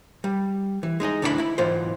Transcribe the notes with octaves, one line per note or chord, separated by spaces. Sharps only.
G3
E3
G#3 D#4 G#4 D#5
D2 D3 D4 E4 G#4 B5
E4 B5
B1 G#2 E3 F4 C5